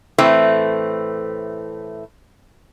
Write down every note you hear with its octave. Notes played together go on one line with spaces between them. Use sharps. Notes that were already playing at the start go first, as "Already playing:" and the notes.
A2 E3 A3 C4